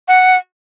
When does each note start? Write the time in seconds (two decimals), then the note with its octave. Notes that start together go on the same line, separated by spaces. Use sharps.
0.08 F#5